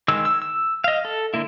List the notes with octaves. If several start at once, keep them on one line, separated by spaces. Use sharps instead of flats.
D#3 G#3 E6
E6
E6
D#5 F5
A4
D3 A#3 E4